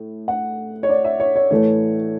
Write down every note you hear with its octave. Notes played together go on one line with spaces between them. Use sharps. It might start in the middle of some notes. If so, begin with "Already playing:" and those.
Already playing: A2
F#5
C#5
D5
E5
C#5
C#5
A2 E3 A3 C#5